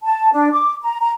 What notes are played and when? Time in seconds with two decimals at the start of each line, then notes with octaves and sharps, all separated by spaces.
0.04 A5
0.33 D4
0.53 D6
0.83 A#5
1.00 A#5